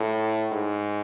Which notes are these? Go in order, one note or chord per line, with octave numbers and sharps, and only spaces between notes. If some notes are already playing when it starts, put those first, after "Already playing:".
Already playing: A2
G#2